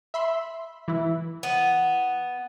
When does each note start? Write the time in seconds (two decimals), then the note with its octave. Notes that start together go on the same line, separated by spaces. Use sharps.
0.14 E5 B5 C6
0.88 E3 E4
1.43 B3